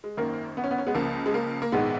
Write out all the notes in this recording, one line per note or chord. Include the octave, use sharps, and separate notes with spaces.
G#3
G#1 F#2 D#3 A#3
B3
C#4
B3
C#4
G#3 B3
C#2 C#3 F3 A#3
G#3
A#3
A#3
A#1 G#2 D#3 G#3 B3